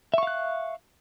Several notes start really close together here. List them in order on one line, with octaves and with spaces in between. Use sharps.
E5 C#6 F5 F#6